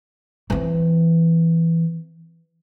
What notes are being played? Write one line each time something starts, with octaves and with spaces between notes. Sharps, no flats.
E3 C4